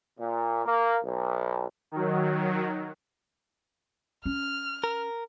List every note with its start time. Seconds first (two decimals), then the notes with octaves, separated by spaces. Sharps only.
0.19 A#2
0.66 A#3
1.04 B1
1.91 D#3 F#3
4.26 C#4 F6
4.84 A#4